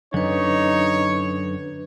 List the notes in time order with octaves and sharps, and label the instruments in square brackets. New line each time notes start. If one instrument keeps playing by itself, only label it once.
[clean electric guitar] F#2 D3 [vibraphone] D4 B4 [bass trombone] D#4 [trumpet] C#5